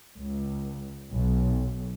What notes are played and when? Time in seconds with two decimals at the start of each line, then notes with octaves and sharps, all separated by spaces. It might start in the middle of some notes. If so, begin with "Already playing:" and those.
0.15 C#2
1.12 B1